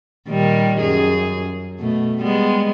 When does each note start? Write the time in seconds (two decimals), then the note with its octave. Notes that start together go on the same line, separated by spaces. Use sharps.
0.28 A#2 D#3 G3
0.81 F#2 G#4
1.80 B2 A3
2.21 G3 G#3 B3